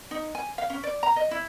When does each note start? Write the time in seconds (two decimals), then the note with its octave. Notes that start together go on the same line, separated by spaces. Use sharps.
0.11 D#4
0.35 G#5
0.58 F5
0.70 C#4
0.83 D5
1.03 A#5
1.16 D#5
1.31 E4